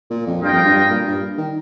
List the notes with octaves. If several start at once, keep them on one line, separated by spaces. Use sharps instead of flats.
A#2
F2
G2 F4 A#4 D#5 G5
F2
G2
G2
A#2
G2
D#3